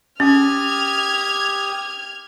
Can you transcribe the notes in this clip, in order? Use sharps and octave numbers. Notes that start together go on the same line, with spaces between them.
C#4 G4 D#6 F6 G#6